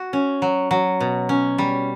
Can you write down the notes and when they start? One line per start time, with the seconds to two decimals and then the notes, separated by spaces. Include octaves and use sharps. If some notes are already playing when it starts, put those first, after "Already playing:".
Already playing: F#4
0.13 C#4
0.42 F#3
0.71 F#3
1.00 B2
1.29 C#4
1.58 G3